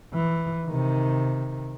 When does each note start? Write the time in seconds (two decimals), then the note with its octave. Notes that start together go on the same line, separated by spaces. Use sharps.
0.14 E3
0.68 C3 D#3